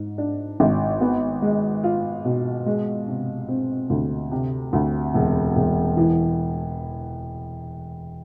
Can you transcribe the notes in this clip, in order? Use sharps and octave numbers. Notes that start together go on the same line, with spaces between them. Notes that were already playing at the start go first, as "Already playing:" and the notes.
Already playing: G#2
D4
G#1
B3
G#3
F4
B2
G#3
C3
C4
D2
C3
D2
E1
E1
E3